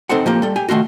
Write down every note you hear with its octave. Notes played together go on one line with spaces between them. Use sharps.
C4 D#4 A4 C5 F#5
F3 A#3 G4
G3 A4
G4 G#5
D#3 A3 F4 F#4